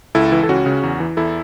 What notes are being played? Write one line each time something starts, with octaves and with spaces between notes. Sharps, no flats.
C#2 E4 A4
E3
A4
C#2 C#4 F#4
C#3
E2
E3
E2 E4 A4